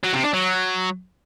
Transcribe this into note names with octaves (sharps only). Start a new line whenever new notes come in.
F#3
C3
D4
F#3